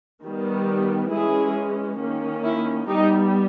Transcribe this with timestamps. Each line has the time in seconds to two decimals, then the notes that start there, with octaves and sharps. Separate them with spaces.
0.23 D#3 G3 B3
1.11 E3 G#3 C#4 E4 G#4
1.99 D#3 A#3 C#4
2.44 E4
2.87 G3 B3 D#4 G4